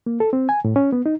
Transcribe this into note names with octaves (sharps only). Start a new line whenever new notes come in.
A#3
A4
C4
G#5
A2
C#4
B3
D#4